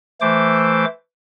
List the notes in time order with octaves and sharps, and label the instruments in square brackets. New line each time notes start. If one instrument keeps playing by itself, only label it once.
[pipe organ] E3 A3 C5 D6